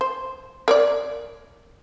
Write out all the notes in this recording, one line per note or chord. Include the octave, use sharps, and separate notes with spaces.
C5
A#4 C#5 D5